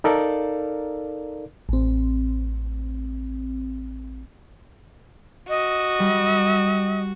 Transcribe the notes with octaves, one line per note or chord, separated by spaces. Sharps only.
D#4 A4 A#4 D5 F5
A1 C4
F#4 D#5
G3